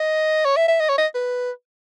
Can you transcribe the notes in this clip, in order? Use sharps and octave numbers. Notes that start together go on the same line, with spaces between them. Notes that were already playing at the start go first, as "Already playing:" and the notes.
Already playing: D#5
C#5
E5
E5
D#5
C#5
D#5
B4